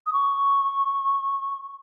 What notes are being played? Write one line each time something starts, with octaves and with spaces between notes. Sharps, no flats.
D#6
C#6